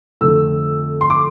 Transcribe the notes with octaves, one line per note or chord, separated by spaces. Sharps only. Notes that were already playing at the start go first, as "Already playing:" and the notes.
F2 D3 A3 E6
C6
D6